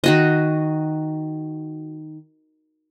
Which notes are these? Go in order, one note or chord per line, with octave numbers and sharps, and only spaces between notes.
D#3 F#4 D#5